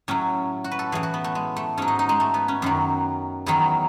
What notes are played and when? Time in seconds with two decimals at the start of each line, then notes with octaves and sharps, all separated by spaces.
0.08 A2 F#3 C#4
0.64 F#4
0.71 B4
0.79 A4
0.92 A2 E3 G#4
1.03 F#4
1.14 B3
1.24 A3
1.35 G#3
1.56 A3
1.77 G#2 F#3 C#4
1.88 D#4
1.99 D#4
2.09 G#3
2.20 A3
2.34 B3
2.48 C#4
2.62 F#2 D#3 F#3
3.46 E2 D#3 F#3 E4